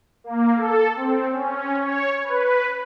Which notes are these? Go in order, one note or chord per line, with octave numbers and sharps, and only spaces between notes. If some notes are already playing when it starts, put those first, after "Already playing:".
A#3
A4
C4
C#4
C#5
B4